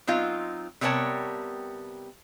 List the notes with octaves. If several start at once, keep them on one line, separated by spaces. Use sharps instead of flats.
F#3 C4 D#4 F4
C3 G3 B3 A#4 C#5 A5